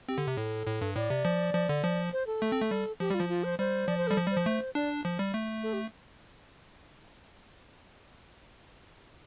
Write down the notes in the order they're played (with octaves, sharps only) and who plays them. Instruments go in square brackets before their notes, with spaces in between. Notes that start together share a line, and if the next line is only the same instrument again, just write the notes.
[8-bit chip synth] C4 [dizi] G4
[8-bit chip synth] D3
C3
[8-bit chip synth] A2 [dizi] A4
[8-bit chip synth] A2
G2
[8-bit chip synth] A2 [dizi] D5
[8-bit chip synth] C3
F3
F3
D3
F3
[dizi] C5
A4
[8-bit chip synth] A3
C4
A3
G3
[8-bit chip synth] F3 [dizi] G4
[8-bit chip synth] G3 [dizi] F4
[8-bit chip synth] F3
[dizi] F4
C5
[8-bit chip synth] G3 [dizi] C5
[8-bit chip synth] F3 [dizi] D5
[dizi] C5
[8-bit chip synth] G3 [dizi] A4
[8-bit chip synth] F3
G3
[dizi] C5
[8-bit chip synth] F3
A3
[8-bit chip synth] D4 [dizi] D5
[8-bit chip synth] F3
G3
A3
[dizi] A4
G4